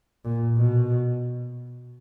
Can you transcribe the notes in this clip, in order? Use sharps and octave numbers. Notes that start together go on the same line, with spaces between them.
A#2
B2